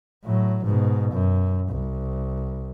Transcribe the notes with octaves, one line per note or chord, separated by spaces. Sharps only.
A2 F#3
G#2 B2
F#2
C2